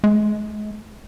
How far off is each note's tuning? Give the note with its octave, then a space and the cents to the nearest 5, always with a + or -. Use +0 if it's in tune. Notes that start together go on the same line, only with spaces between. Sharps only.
G#3 +35